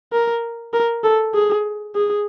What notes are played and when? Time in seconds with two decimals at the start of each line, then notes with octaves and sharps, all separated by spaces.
0.12 A#4
0.73 A#4
1.04 A4
1.34 G#4
1.95 G#4